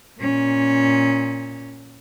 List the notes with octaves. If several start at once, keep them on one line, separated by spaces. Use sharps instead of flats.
A#2 C#4